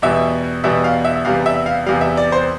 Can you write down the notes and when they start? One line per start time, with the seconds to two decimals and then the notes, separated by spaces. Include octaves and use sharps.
0.02 E2 B2 G3 E5
0.64 E2 B2 G3 E5
0.84 F5
1.05 E5
1.25 E2 C3 G3 F5
1.46 E5
1.66 F5
1.86 E2 C3 G3 F5
2.01 E5
2.17 D5
2.32 C5